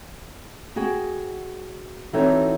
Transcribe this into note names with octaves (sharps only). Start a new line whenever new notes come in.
F#4 G#4 G5
E3 C4 D#4 F#4 A4 C#5